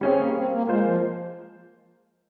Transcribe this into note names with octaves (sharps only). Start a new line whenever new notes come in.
G3 C4 C#4 G#4 C#5
A#3
C4
A#3
G#3 A#3 F4 C5
F3